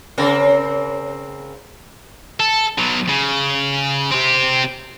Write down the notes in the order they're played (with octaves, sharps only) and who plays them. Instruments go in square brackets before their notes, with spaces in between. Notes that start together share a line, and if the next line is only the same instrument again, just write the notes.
[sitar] C#3 C4 A#4
[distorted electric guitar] A4
B2 F#3
C#3
C4 G4